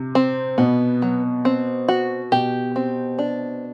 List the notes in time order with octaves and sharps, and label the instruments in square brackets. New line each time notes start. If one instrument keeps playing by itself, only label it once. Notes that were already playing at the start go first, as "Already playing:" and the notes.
Already playing: [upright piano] C3
[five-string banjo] C4
[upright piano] B2 [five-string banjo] B3
[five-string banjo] F#3
C4
F#4
[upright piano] B2 [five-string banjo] G4
[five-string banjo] C4
D4